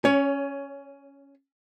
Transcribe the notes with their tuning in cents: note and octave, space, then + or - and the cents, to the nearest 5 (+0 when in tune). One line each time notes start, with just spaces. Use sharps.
C#4 +0 C#5 +25